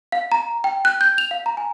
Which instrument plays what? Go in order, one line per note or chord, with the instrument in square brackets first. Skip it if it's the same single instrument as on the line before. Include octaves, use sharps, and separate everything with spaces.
[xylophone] F5
A#5
G5
F#6
G6
F7
F5
A#5
G#5